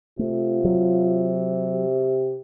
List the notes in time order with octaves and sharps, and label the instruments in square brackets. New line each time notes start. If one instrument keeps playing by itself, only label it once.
[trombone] C3 [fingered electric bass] A3 [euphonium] F4
[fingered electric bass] F#3
[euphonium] G4